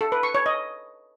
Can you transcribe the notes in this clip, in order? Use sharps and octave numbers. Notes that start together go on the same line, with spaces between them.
A4
B4
C#6
C#5
D#5